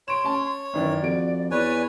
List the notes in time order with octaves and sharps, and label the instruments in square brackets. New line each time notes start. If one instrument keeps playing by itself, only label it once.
[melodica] C#5 [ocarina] C6 [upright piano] D7 E7
[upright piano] C#4 A5
[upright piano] F#2 D#3 E3 [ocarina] D5
[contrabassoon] F2 [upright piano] F#4 D7
[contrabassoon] E2 [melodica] B4 C#5 G#5 [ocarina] D5